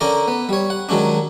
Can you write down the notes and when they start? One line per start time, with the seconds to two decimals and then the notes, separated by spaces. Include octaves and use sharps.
0.01 D3 C#4 A#4 D5 A#5
0.28 B3
0.49 G3 C#5
0.70 F#5
0.89 D#3 F#3 G#3 C#4 D4